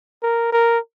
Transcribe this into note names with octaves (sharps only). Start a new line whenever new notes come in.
A#4
A#4